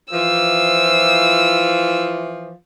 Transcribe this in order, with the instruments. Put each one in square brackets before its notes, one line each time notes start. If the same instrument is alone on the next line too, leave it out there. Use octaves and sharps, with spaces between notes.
[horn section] E3 F3 [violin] E6